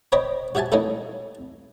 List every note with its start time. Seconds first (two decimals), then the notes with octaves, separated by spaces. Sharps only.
0.12 C5 C#5 D#5 G5 B5
0.55 F#4 G4 E5 G#5 A5
0.72 A#3 C#4 D#4 E4 A4